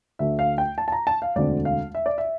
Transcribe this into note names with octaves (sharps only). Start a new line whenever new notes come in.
D2 D3 A3 E5
F5
G5
A5
A5
A#5
A5
F5
E1 D2 D3 A3 C4 D5
F5
E5
D5
E5